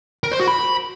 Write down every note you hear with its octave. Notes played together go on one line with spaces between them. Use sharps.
A#4
C5
F#4
B5